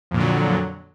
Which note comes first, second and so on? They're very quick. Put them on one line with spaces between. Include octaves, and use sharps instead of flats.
F2 A#2 D3 F#3